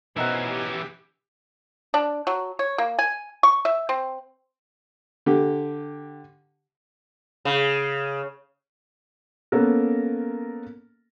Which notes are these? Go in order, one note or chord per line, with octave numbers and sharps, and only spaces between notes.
B2 E3 C#4 D#4 F#4 A#4 C5 E5
G4
D4
F#3
C#5
A#3
G#5
C#6
E5
C4
D3 G4
C#3
A#3 B3 C#4 A4 A#4